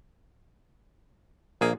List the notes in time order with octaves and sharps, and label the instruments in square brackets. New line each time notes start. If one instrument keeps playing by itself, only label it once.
[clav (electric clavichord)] A#1 G#4 [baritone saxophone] A#3